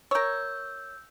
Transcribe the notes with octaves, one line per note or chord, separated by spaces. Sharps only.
A#4 C#5 E6 G6